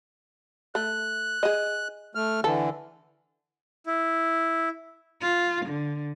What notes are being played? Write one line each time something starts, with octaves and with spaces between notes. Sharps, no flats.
A3 F#6
G#4 D#5
A3 F6
D3 E3 A4
E4
F4
D3